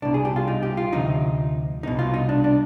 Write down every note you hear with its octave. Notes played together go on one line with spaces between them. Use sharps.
C2 B2 D4
G#4
G4
F4
D#4
G4
F4
D2 C3 F3 D#4
C2 B2 D#4
F4
D#4
D4
D4